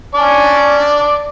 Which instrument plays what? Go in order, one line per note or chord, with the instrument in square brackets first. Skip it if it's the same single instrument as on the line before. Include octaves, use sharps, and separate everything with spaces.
[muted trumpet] C#4 [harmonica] D5 A5